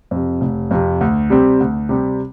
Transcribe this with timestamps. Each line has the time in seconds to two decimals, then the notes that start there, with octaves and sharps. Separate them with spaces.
0.11 F2 C3
0.41 F1
0.71 F2 C3
1.01 D2
1.30 C3 G3 C4
1.61 D2
1.89 C3 G3 C4